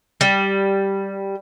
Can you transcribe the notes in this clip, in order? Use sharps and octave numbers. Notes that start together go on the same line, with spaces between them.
G3